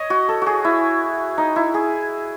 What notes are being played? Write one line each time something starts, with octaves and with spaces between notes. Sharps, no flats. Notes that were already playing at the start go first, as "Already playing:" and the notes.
Already playing: C#5 D#5
F#4
A4
F#4 G#4
E4
D#4
E4
G#4